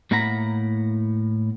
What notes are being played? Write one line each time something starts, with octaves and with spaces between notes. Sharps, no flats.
A2 A#3 E4 F#5 A#5 B5